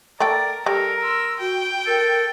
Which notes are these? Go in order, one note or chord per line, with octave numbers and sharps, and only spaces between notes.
A3 A4 A#4 D5 G5
G3 A4 A#4 A#5
C6 E6
F#4 G5
A4 A#4